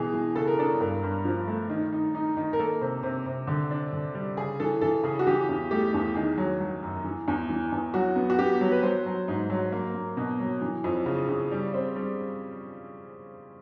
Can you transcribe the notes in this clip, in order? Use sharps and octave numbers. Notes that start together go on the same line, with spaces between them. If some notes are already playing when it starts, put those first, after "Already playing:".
Already playing: B2 E3 G#4
E3
C#3 A4
A#4
D4 A4
G2 A#4
G2
F3
A3
D#3
D#4
D#4
D#3
A#4
A#3 A4
C3
C3
C3
D3
D4
D3
G3
C#3 G#4
E3 A4
E3 A4
C#3 G#4
F#4
E3 G4
E2
A3 G4
E2
D#3 G#4
F#3
F#3
F#2
E3
E2
E3
E2
F#3 F#4
B3
F#4
B3 G4
F#3
B4
F#3 C5
F#3
G#2
F#3
A#3
A#3
B2
F#3
E3
F2
C#3
C#3
G3
C4
G3